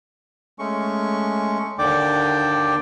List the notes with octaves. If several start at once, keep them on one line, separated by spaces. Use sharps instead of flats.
G#3 A3 C#4 C#6
D#2 D3 D4 D5 G5 D6